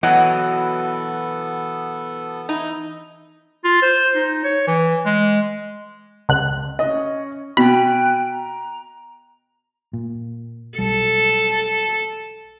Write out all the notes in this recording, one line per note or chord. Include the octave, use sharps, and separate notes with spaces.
B2 E3 F#3 B3 A4 D#5 F#5
D#4 E4
F4
C5
D#4
C#5
E3
G#3
C#2 F#6
C#4 D#5
B2 G5 G#5 B5 F#6
A#5
A#2
B1 G3 A4